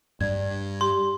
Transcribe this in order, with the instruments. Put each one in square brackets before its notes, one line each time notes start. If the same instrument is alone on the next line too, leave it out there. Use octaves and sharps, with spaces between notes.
[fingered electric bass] G2 G3 [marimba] D5 G#6
[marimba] G4 [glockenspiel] C6